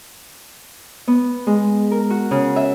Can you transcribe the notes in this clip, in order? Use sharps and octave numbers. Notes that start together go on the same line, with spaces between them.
B3
G#3
A#4
F#4
C#3
E5